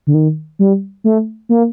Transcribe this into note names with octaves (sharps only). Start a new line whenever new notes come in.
D3
D#3
G3
A3
A#3